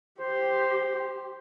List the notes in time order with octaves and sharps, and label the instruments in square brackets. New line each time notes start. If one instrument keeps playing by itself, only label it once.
[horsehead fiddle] G4 [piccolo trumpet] C5